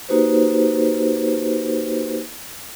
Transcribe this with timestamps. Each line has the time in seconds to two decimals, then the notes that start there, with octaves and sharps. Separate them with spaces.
0.09 A#3 D#4 F#4 G4 B4 C5